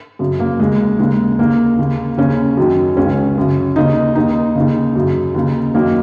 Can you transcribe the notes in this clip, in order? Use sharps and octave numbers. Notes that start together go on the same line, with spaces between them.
F#2 C#3
A#3
D#2 C#3 G#3
D#2 C#3 G#3
D#2 C#3 A#3
D#2 C#3
D#2 C#3 C#4
F#2 D#3
C#2 C#3 C#4
F#2 C#3
D#2 C#3 D#4
D#2 D#3 D#4
D#2 C#3
F#2 C#3
D#2 C#3
F#2 D#3 A#3